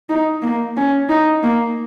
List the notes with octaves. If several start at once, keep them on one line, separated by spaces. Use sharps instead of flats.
D#4
A#3
C#4
D#4
A#3